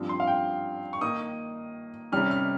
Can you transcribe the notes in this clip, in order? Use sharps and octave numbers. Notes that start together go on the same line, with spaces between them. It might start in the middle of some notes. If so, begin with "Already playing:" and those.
Already playing: G2 F3 C4
C6
F5
G5
C#6
D#3 A#3 D#4 D#6
C3 D#3 G3 C#4 F6
F6